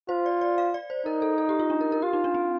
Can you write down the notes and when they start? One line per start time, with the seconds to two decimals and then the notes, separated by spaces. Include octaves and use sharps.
0.09 F4 C5
0.26 D5
0.41 D5
0.58 F5
0.74 D5
0.90 C5
1.06 D#4 A#4
1.22 A4
1.38 A4
1.49 G4
1.59 F4
1.70 D4
1.81 A#4
1.92 A#4
2.02 F4 G4
2.13 D#4
2.24 D4
2.35 C4